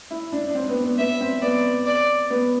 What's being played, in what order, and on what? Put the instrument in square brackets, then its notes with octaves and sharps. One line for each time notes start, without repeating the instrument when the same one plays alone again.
[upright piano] E4
D4
D4
C4
B3
B3
[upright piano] B3 [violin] E5
[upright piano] C4
[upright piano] B3 [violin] D5
[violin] D5
[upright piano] B3